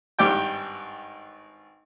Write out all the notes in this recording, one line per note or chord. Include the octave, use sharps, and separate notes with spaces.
G#1 G2 G4 D5 G5